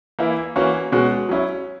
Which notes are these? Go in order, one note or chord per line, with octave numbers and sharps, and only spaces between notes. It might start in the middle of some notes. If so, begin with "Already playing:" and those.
E3 A#3 E4
E3 A#3 C#4 F#4
B2 G#3 C#4 F#4
F#3 C#4 E4